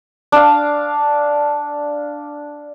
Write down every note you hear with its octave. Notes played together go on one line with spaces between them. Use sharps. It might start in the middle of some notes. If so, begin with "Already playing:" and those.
D4 F5